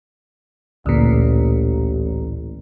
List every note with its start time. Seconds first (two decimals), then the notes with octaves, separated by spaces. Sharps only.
0.86 A1 D2 A#2